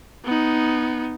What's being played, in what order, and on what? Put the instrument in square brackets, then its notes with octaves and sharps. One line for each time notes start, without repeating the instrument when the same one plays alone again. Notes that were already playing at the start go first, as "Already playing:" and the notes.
[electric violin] B3 D#4